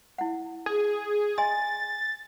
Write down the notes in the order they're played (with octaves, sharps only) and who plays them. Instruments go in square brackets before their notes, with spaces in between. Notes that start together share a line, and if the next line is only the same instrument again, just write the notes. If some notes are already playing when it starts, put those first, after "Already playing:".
[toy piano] E4 F#5
[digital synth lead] G#4
[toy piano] D#5 G#5 C6 [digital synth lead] A6